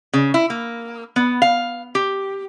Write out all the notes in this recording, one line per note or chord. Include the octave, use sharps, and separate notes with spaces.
C#3
E4
A#3
B3
F5
G4